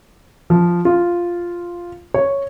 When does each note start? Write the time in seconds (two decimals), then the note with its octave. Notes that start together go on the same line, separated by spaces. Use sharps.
0.50 F3
0.85 F4
2.14 C#5